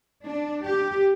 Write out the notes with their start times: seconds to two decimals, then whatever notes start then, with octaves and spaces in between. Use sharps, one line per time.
0.25 D4
0.65 G4